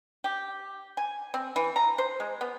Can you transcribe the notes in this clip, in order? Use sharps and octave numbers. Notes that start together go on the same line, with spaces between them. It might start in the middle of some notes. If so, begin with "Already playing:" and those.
G4
G#5
C4
E3
A#5
C5
G#3
B3